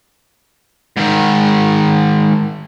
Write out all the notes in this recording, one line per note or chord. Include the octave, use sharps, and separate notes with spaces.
G#2 D#3